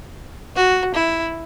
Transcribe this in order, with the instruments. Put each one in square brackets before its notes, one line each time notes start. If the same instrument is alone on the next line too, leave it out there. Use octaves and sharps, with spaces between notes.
[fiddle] F#4
E4